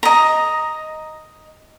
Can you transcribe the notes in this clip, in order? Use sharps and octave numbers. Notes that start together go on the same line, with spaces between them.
D#5 A#5